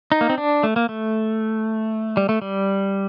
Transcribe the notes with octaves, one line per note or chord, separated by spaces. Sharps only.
D#4
A#3
C4
D4
A3
A#3
A3
G3
A3
G3